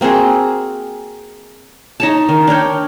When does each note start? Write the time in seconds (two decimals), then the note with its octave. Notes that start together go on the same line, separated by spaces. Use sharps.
0.01 A#3 C4 F#4 G#4
2.00 D#4 C#5 A5
2.29 D#3
2.47 D4 A#4 C#5 G5